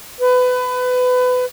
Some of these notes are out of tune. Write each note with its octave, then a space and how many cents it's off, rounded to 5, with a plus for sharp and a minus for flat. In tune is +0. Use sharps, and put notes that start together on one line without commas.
B4 +25